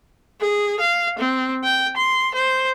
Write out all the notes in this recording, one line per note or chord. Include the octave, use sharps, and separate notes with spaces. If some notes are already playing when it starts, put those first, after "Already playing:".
G#4
F5
C4
G5
C6
C5